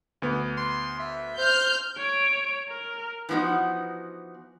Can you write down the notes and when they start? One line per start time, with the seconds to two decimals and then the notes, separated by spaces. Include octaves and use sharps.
0.22 D2 B3
0.57 C6
0.99 E5
1.38 C5 F6 G6
1.98 C#5 D7
2.69 A#4
3.29 E3 F3 B3 D#4 F#4